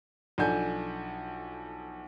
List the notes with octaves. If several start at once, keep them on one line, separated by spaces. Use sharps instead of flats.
B1 F3 D4 A4 G#5 G6